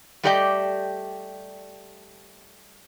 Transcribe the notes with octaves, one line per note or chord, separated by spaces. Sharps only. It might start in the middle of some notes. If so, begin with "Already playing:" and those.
G3 A3 G4 D5 D#5 G5